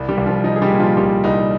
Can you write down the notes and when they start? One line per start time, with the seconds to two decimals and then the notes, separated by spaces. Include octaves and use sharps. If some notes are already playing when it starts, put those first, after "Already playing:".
Already playing: C2
0.09 G3 G4
0.17 C2
0.26 F3 F4
0.44 F3 D#4
0.56 G#4
0.62 G3 G4
0.71 A#2
0.79 F3 F4
0.97 C2 G3 G4
1.24 C2 D#4